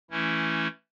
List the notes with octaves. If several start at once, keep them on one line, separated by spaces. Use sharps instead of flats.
E3 A3 C#4 E4